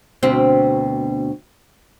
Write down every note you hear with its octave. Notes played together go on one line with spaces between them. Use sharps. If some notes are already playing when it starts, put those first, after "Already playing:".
D2 B2 C4